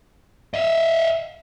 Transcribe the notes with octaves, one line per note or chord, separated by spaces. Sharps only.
D#5 E5